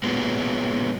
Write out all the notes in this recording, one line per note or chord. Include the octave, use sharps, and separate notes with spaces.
A#2 F#3 G#3 B3